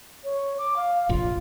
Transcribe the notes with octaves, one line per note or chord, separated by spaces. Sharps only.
C#5
D6
F5
F1 A#1 F2 F4